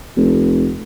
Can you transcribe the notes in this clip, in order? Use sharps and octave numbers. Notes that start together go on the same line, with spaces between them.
F1